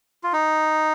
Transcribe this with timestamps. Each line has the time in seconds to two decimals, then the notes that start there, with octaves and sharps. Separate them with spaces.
0.23 F4
0.33 D#4